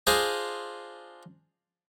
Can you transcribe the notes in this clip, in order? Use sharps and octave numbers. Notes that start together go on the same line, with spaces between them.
D4 F4 G#4 C5 D#5